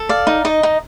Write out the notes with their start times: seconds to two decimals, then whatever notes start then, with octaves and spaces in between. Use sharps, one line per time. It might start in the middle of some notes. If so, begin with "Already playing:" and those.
Already playing: A4
0.09 D5 F5
0.27 D#4
0.45 D#4 D#5
0.63 D#4